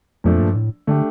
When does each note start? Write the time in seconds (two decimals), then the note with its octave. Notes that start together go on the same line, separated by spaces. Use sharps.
0.24 F2 A#2 F3 A3 D4
0.40 G2
0.56 A2
0.87 D3 A3 D4 G4